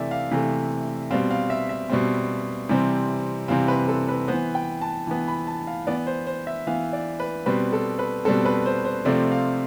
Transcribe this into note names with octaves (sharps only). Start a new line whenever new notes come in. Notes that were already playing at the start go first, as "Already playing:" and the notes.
Already playing: C3 E3 A3 D5 E5
F5
C3 E3 A3
B2 G3 C4 F5
F5
E5
E5
B2 G3 C4
C3 E3 G3 C4
C3 E3 G3 C4 F5
B4
A4
B4
E3 B3 C5
G5
A5
E3 B3
B5
A5
F5
E3 B3 D5
C5
C5
E5
E3 B3 F5
D5
B4
B2 G3 C4 B4
A4
B4
B2 G3 C4 A4
B4
C5
C5
C3 F3 A3 C4 D5
F5